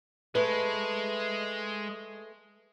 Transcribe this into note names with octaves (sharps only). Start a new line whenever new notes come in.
G#3 A3 B4